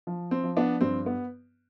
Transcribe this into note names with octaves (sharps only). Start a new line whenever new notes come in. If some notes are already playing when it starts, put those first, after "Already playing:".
F3
C4
F3
B3 D4
G2 C4
B3